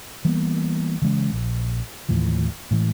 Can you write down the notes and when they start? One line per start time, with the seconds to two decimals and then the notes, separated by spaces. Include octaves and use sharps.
0.25 E3 G3 A#3 B3
1.02 C#3 E3 G#3 C#4
1.32 A#1
2.09 D#2 A2 E3 F3
2.71 A2 E3 G#3